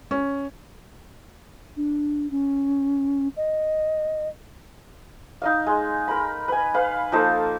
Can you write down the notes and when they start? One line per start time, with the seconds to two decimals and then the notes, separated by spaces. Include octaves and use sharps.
0.11 C#4
1.77 D4
2.31 C#4
3.37 D#5
5.42 D#4 D#5 F5
5.66 G#3
6.08 A#4 B5
6.48 B4 G#5
6.74 B4 F5
7.12 F3 A#3 D#4 A4